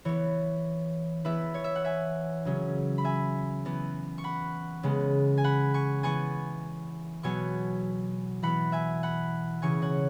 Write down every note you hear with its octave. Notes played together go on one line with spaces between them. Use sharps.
E3 B3 C#5
E3 B3 B4 E5
C#5
E5
F#5
E5 G#5
C#3 F#3 C#4
B5
E5 G#5
E3 B3
C#6
F#5 B5
C#3 G#3 B3
G#5
F#5 B5
G#5 C#6
E3 B3 G#5 C#6
B2 F#3 B3 G#5 C#6
E3 B3 F#5 B5
E5 G#5
F#5 B5
C#3 E3 C#4 G#5 C#6
C#5 F#5